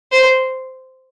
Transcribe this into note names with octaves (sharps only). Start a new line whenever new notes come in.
C5